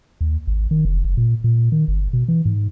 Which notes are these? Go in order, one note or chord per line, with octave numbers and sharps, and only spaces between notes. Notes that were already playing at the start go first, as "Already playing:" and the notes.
D#2
G#1
D#3
F1
F#1
A#2
A#2
D#3
G1
B2
E3
G#2